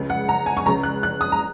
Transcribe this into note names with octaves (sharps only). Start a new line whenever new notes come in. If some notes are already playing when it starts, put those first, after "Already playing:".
Already playing: C#2 C#3
F#5
A#5
G#5
C#6
C#2 C#3 A#5
F#6
F#6
D#6
A#5